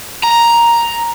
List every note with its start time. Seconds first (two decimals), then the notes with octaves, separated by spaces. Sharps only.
0.23 A#5